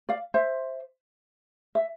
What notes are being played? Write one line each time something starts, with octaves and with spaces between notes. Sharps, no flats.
D5 F5
C5 E5
E5